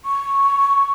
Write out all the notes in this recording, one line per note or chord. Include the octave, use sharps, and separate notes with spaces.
C#6